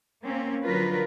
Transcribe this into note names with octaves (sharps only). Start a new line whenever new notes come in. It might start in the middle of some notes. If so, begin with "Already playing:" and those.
A#3 C4 C#4
D3 F3 F#3 F4 A#4 B4